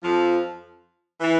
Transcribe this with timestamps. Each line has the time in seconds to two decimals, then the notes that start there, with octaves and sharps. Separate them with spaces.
0.03 F2 F3
1.21 E3